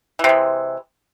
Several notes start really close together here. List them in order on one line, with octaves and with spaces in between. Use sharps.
E3 C3 G#3